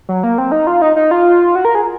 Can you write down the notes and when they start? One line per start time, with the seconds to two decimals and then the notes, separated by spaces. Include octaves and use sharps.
0.09 F#3
0.23 A#3
0.38 C4
0.52 D#4
0.67 F4
0.82 D#4
0.96 D#4
1.11 F4
1.55 F#4
1.65 A#4
1.75 G#4